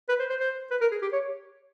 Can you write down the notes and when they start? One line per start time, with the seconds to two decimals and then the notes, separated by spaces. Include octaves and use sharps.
0.09 B4
0.20 C5
0.30 C5
0.40 C5
0.71 B4
0.81 A#4
0.92 G#4
1.02 G4
1.13 C#5